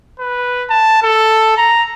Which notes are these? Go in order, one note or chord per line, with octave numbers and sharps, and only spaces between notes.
B4
A5
A4
A#5